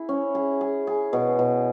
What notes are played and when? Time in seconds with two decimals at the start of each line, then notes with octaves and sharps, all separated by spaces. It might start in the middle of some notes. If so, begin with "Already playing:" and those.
Already playing: E4 G#4
0.09 C#4
0.35 G#4
0.61 G#4
0.87 G#4
1.13 B2
1.39 B2